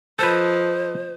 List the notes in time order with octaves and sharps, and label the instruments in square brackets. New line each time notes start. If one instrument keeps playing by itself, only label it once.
[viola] F3 D#5 [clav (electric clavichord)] A4 B4 [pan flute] C5